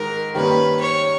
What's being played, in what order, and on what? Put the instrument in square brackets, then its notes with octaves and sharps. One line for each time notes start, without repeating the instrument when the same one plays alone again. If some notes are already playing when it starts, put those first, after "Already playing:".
Already playing: [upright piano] G#2 D#3 [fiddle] A#4
[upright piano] D#3 G3 A#3 C#4 [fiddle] B4
[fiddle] C#5